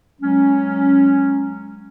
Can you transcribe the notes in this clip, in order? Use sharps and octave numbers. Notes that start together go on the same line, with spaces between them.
F#3 G#3 C#4